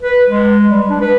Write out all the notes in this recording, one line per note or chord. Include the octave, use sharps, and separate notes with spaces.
B4
G#3
G3
D4
B4